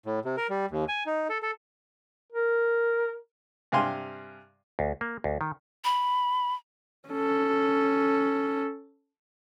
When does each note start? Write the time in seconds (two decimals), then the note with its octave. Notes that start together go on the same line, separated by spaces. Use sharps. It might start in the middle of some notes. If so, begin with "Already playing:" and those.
0.06 A2
0.25 C3
0.37 A#4
0.50 G3
0.70 D#2
0.88 G#5
1.06 D#4
1.30 A4
1.42 A4
2.33 A#4
3.72 G2 C3 F5 G#5 C6
4.79 D2
5.01 A#3
5.24 D2
5.41 D#3
5.84 B5
7.09 C#4 A4